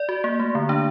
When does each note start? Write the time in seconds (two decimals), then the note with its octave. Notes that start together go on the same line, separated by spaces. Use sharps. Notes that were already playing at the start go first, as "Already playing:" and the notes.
Already playing: D5
0.09 F#4
0.24 A#3
0.40 A3
0.55 D3
0.69 D4